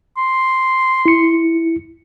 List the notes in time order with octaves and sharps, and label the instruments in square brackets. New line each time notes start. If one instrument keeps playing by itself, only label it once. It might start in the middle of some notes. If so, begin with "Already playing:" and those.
[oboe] C6
[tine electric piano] E4 C#7